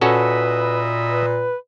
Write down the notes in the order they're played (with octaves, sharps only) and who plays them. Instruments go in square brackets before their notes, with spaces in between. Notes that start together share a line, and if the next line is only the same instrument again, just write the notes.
[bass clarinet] A#2 [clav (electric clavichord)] C#4 F#4 A4 [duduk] B4 [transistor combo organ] D#5 E5 B5
[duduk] B4